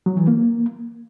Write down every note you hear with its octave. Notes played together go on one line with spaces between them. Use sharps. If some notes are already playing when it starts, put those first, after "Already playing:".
F#3
E3
A#3